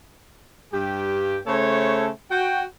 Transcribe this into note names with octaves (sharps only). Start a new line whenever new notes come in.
G2 G4
C#3 A3 A4 C5 C#5
F#4 G5